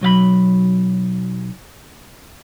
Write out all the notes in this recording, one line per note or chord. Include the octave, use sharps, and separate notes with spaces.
B1 F#3 F5 B5